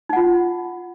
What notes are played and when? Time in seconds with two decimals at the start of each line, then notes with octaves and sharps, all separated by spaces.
0.09 D#4
0.13 F#5
0.16 F4